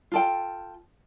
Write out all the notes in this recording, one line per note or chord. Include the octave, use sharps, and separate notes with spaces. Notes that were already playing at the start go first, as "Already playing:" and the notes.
F4 A4 G5